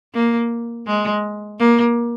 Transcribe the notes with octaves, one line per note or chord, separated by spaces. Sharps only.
A#3
G#3
A#3